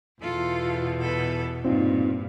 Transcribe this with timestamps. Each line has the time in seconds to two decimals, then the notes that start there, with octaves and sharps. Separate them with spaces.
0.22 E2 B2 F4 A4
1.01 A4 B4
1.65 G2 A#2 C4 D#4 F4